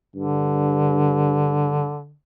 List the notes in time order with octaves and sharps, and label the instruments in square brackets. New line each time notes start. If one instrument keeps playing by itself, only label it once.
[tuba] G2 [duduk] D3